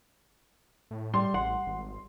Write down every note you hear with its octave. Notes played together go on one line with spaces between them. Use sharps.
A2
G3 C6
A1 F#5 C6
G#1